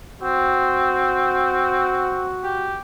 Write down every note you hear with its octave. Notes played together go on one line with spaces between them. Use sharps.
C4 F#4
G4